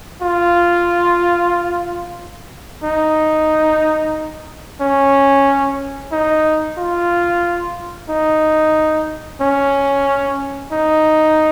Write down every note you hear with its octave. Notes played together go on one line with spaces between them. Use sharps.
F4
D#4
C#4
D#4
F4
D#4
C#4
D#4